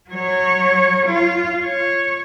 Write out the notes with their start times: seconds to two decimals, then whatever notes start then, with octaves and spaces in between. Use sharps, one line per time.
0.10 F#3 C#5
1.06 F4
1.64 C#5